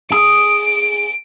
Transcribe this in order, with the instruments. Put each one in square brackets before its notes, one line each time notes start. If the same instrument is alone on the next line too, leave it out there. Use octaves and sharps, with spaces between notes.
[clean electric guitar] G#4 [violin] D7